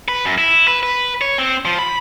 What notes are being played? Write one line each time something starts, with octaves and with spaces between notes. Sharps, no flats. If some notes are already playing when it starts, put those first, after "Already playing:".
B4
F#2
E4
B4
B4
C#5
C4
F3
B5